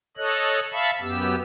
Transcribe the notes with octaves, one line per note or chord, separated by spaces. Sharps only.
A4 C#5 D#5 F#6
E5 F5 A5 B5 C#6
F#2 B3 G4 E6